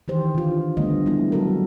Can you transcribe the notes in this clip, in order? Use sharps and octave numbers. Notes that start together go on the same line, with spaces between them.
D#3 E3 G4 C5
D3 F4
D3 G3 A3 B3 D#5
G3 G#3 B3 C4 E4
F#3 G3 F#4 A4 A#4